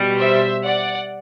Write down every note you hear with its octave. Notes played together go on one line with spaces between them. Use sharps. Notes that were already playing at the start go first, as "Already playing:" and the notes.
Already playing: B2 G3
C5 E5
D5 F#5